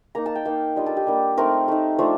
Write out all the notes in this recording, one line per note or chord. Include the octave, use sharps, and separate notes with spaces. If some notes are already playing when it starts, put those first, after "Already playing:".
A#3 D#4 A#5
A5
G5
A#3 D#4 F5
G3 D4 F4 D#5
A4
G4
G3 A#3 D4
A3 C4 D#4 A#4
A3 D#4
F3 A3 D4